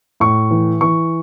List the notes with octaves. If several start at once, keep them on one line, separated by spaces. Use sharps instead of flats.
A2 C#6
E3
E3 C#6